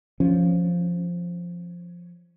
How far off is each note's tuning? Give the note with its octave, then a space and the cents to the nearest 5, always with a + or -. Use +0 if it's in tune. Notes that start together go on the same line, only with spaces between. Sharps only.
F3 +0 C#4 +0